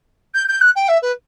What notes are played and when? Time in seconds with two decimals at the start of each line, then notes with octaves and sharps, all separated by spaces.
0.35 G6
0.48 G6
0.61 F#6
0.76 G5
0.88 E5
1.02 B4